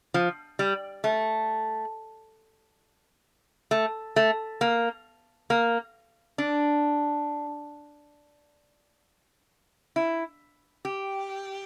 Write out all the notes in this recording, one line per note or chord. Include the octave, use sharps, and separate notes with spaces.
F3
G3
A3
A3
A3
A#3
A#3
D4
E4
G4